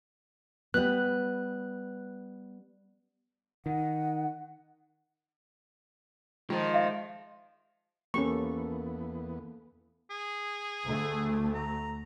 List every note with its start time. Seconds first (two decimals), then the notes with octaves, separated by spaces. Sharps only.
0.74 G3 B3 F#6
3.66 D#3 F#5
6.50 D#3 F3 G#3 F4
6.74 E5 F5
8.14 E2 A#3 B3 C#4 G4 A4 C#6
10.11 G#4
10.85 D2 A3
11.55 A#5